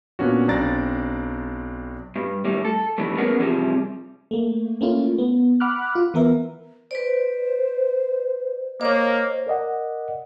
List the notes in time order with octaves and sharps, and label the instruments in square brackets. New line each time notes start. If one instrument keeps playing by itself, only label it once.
[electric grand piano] A#2 A#3 B3 C#4 D4 F#4
B1 C4 D4 D5 A#5 A6
[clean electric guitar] G2
D#2 A2 G3
A4
F2 D3 E3 G3 A3
A#3 B3 C#4 G#4 A#4 F#5
C3 E3 F3 G3 C4 G#4
[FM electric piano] A3 A#3
A3 A#3 C#4 E4 F4
B3
F#5 B5 D6 F6 F#6
F4
E3 B3 A#4 E5
[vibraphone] B4 D5 [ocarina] C5
[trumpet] A#3 [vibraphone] C5 [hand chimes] C#5 D#5
[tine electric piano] A#4 D5 D#5 F#5